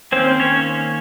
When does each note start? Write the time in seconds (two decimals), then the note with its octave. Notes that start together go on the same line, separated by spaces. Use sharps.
0.12 D#3 A#3 C4 C#4 C5
0.40 C#4 C#5